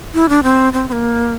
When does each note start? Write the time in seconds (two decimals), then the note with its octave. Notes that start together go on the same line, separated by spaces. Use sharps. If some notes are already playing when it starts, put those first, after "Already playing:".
0.14 E4
0.29 D4
0.43 C4
0.73 C4
0.89 C4
0.92 A#3